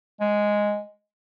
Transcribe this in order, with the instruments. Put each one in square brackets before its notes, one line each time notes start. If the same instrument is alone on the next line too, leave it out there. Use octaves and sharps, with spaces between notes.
[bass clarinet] G#3